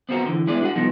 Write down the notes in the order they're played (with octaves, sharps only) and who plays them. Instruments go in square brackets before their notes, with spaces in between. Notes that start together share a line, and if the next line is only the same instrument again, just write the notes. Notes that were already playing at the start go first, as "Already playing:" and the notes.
[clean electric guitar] B3 C4 E4 F#4 A#4
D3 E3
G#3 B3 E4 G#4 D5
D4 F#4 G#4 F#5
C2 F3 B3 D#4 A4